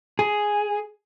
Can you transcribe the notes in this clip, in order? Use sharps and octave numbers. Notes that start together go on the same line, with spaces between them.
G#4